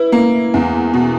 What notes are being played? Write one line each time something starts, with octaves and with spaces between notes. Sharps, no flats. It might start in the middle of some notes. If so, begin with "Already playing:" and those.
Already playing: E4 B4
A#3
E2
B2